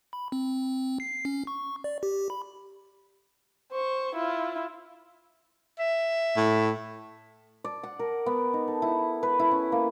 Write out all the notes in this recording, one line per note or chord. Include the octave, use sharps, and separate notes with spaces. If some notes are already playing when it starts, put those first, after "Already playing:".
B5
C4
C7
C#4
C#6
D5
G4
B5
C5 C#6
E4 F4
E5
A2
D5
F#5
A#4
B3
D#4
A4
E4
B4
E4
C#4
A#3